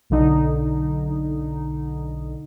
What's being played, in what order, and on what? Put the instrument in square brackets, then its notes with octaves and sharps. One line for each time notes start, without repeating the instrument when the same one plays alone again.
[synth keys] B1 D3 D#4